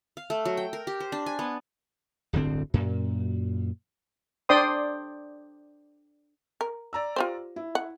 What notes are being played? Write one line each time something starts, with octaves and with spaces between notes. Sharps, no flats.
F5
A3
F#3
G5
A#4
G4
C5
D4
G#5
B3
D1 G1 D3 C4
F#2 A#2
D4 C5 D5 G5 C6 D#6
A#4
D5 A#5 E6
F4 G4 C5
E4
F#5